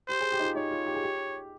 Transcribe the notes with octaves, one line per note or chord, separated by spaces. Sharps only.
G4 C5
G#4
G4
D#4
F4
D#4 C#5
F4
G4
G#4
G4